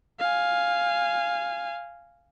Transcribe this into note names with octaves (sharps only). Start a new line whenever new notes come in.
F5 G#5